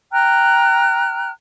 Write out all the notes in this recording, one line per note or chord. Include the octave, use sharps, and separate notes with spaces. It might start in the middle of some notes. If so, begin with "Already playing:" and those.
G5 A#5 F6 F#6